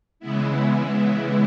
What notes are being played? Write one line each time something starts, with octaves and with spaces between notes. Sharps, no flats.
C#3 E3 G#3 B3 E4